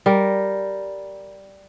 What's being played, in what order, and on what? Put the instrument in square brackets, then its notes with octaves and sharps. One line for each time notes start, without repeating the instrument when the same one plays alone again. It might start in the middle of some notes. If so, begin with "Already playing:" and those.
[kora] G3 A#4